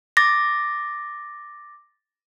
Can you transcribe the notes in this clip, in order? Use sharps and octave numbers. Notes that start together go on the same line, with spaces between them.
D6 A6 A#6